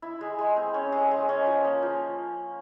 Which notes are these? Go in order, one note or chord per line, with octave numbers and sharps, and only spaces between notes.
E4
G#3
G#3
C4
C#4
G#3
G#3
C#4
F3
A#3
F3